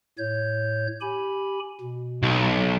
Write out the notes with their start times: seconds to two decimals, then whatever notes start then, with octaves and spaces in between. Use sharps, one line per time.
0.18 A2 C#5 G6
1.01 G4 G#5 B5
1.81 B2
2.23 B1